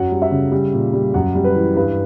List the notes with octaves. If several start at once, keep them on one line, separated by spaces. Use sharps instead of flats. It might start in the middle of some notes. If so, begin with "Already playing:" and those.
Already playing: F#2 F#3 F#5
G3
E5
C#3
G3
A#2
G3
F#2 F#5
G3
B4
E3
G2 B4